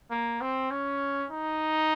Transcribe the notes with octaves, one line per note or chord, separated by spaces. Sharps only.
A#3
C4
C#4
D#4